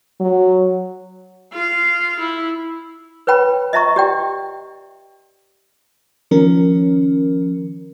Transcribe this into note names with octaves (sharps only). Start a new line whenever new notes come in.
F#3
F4 F5
E4
B4 C#5 G5 B5
D#5 E5 A#5 C#6
G4 D5 G5
D#3 F3 C#4 A#4